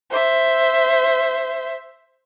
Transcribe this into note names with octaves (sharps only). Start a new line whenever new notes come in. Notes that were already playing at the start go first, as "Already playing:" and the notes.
C5 E5